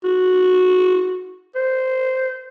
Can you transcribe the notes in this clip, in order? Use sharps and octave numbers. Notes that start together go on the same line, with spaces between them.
F#4
C5